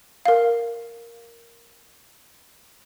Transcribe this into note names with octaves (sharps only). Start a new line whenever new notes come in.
A#4 F5